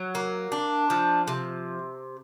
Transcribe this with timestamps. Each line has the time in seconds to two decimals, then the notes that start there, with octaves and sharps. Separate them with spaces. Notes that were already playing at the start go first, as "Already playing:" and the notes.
Already playing: F#3
0.15 A#3
0.52 D4
0.90 F3
1.28 C3